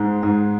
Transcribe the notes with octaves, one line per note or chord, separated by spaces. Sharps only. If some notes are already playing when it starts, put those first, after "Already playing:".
Already playing: G#2 G#3
G#2